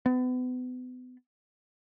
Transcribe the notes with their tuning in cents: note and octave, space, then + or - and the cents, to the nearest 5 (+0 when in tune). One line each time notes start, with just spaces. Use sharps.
B3 +35